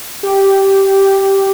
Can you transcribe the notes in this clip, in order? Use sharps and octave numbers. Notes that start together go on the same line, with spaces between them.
G4